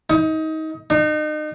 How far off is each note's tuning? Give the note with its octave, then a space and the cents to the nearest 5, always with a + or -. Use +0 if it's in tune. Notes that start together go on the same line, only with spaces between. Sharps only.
D#4 +25
D#4 -35